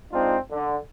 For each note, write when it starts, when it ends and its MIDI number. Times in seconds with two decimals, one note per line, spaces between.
0.11 0.35 56
0.11 0.35 60
0.11 0.35 62
0.11 0.35 63
0.11 0.35 65
0.51 0.76 50